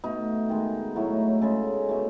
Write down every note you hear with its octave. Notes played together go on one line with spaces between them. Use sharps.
B2 A3 D#4
D#3 G#3
A2 F#3 A3
C#3 G#3 A4
B2 A3